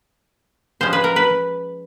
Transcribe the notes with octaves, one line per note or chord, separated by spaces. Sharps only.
F3 G#3 C#4 C5
B4
A#4
B4